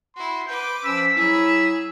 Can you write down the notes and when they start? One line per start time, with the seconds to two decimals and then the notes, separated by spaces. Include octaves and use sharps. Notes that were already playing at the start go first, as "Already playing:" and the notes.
0.16 E4 F#4 C6
0.48 B4 D6 G6
0.84 F3 C#4 E6 B6
1.17 F#3 E4 G#4 E6